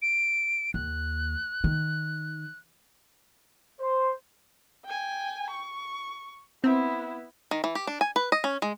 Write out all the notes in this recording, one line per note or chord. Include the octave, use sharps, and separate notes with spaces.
D7
D#2 F#6
D#3
C5
G5 G#5
C#6
B3 C4 E4
D#3
E3
G4
D4
G#5
B4
D#5
C#4
G#3